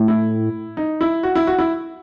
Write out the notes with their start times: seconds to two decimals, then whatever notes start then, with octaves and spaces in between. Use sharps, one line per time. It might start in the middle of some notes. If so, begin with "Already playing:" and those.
Already playing: A2
0.08 E4
0.77 D#4
1.01 E4
1.23 F#4
1.35 E4
1.47 F#4
1.59 E4